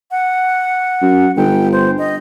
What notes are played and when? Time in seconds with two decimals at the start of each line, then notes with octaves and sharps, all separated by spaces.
0.11 F#5
1.02 F#2
1.36 G1 G5
1.72 C5
1.98 D#5